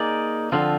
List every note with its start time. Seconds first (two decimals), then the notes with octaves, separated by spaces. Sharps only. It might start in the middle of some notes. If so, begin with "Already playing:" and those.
Already playing: A#3 D#4 G#4 D5
0.52 D3 F3 C4 F4